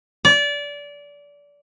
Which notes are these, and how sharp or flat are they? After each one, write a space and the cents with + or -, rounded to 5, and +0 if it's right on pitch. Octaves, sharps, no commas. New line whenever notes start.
D5 -25